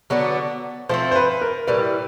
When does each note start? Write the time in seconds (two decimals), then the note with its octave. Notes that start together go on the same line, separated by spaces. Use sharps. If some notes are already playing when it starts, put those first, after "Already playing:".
0.10 D3 F#3 B3 D4
0.89 F3 A3 C4 C5
1.11 C5
1.16 B4
1.41 A#4
1.67 A2 E3 G3 B4